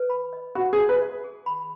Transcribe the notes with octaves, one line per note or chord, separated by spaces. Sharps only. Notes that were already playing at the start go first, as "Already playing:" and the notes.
Already playing: B4
B5
D#5
F#4 B5
G#4
C#5
B4
E5
G#4
B5